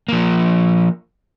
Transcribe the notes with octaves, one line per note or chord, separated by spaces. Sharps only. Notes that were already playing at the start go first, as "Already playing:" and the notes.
F3 A#3